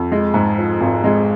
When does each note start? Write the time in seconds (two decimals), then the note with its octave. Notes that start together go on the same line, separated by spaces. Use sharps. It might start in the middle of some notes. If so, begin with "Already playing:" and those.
Already playing: F2
0.12 G#3
0.34 G#2
0.58 F3
0.81 G#1
1.04 G#3